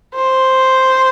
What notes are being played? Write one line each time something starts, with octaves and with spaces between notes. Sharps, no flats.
C5